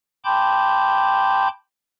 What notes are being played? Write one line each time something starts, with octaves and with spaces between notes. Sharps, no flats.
G5 A5 B5 C6 D6 G6